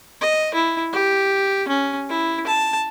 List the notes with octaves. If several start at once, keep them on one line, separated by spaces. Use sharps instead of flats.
D#5
E4
G4
C#4
E4
A5